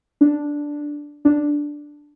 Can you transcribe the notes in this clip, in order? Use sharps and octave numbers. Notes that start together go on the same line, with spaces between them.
D4
D4